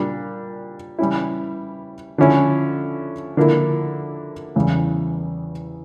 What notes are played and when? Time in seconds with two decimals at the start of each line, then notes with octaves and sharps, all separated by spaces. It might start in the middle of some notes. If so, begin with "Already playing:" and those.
Already playing: A#2 G3 D4
0.99 E3 G3 C#4 E4
2.18 D3 F3 C#4 E4
3.37 D3 F3 A#3 E4
4.56 E2 C#3 E3 G3